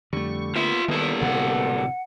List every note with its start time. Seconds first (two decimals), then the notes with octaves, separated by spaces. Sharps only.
0.13 F2 D3 G3 A3 C#6
0.56 A#3 B3 F4 E5
0.88 B2 D#3 G3 A#3 E4 A4
1.21 D1 D2 C3 F#5